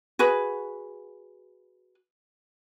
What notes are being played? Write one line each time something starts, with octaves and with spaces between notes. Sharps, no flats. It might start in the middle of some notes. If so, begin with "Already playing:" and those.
F#4 G#4 B4